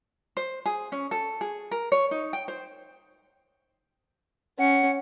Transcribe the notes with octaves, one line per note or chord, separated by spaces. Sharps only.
C5
G#4
C#4
A4
G#4
A#4
C#5
D#4
G5
C5
C#4 F#5